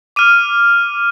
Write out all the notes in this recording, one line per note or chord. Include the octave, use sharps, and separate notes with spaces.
D6 F6 D#7